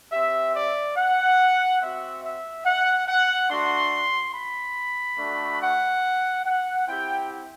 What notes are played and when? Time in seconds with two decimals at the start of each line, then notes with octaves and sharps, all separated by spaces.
0.12 C4 G4 E5
0.55 D5
0.97 F#5
1.81 C4 F#4 E5
2.24 E5
2.66 F#5
3.08 F#5
3.50 A3 D4 F#4 C6
4.34 B5
5.18 A3 D4 F#4
5.61 F#5
6.45 F#5
6.87 C4 E4 G4 G5